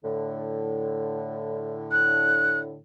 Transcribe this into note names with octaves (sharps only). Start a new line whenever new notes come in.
A2 D3
F#6